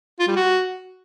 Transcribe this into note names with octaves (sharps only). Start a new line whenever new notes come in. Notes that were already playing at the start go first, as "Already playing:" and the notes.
F4
G3
F#4